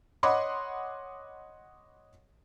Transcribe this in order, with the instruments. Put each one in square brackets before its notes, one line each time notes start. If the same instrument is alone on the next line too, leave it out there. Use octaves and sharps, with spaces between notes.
[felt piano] C#5 D#5 F#5 B5 C6 D6